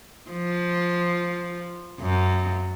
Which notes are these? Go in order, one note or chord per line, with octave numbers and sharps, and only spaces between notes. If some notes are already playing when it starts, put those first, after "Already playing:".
F3
F#2